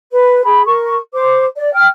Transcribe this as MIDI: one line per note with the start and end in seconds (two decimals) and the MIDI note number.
0.12 0.44 71
0.44 0.64 68
0.44 0.64 83
0.65 0.96 70
0.65 0.96 85
1.13 1.45 72
1.13 1.45 86
1.55 1.72 74
1.73 1.87 79
1.73 1.87 89